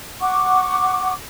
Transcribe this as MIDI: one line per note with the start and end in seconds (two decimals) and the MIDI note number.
0.21 1.12 78
0.21 1.12 85
0.21 1.12 86